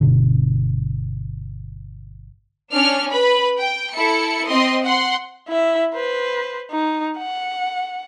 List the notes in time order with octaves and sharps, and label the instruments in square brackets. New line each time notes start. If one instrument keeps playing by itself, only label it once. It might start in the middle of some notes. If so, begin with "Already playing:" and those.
[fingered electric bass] G1 B2 D3
[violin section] C#4 D4 F6
B4 B5
G5
E4 A4 C#7
C4 D#5 C6
F#5 C6
[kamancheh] E4 E5
B4 C5
D#4
F#5